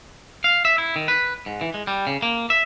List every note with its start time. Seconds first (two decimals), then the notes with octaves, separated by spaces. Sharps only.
0.44 F5
0.65 E5
0.78 E4
0.96 D#3
1.08 B4
1.46 G#2
1.61 E3
1.74 G#3
1.87 G3
2.07 C#3
2.22 A#3
2.50 E5